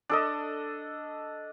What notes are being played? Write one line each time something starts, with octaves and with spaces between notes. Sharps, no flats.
D4 A4 D#5